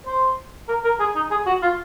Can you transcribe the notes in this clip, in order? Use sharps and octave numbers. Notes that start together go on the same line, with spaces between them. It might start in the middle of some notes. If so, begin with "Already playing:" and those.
C5
A#4
A#4
G#4
D#4
G#4
F#4
F4